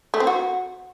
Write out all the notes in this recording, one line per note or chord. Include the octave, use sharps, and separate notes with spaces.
A3
C4
F#4